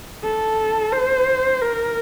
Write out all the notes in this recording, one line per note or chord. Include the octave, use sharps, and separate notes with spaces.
A4
C5
A#4